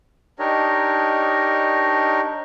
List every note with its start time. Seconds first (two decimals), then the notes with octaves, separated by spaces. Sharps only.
0.39 D4 D#4 G4 A#4 C#5 D#5